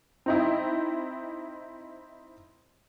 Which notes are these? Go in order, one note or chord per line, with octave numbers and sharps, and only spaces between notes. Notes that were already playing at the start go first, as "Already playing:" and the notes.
C4 D#4 E4